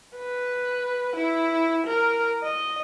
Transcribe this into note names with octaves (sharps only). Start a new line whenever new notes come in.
B4
E4
A#4
D#5